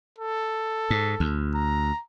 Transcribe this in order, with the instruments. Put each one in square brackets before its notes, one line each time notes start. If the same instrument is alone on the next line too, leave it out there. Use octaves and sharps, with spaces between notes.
[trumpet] A4
[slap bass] G#2
D2
[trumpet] A#5